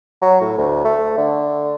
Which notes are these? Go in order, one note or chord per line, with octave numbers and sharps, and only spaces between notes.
F#3
A2
D2
A3
D3